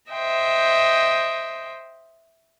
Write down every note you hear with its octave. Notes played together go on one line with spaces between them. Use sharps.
C5 D#5 E5 G5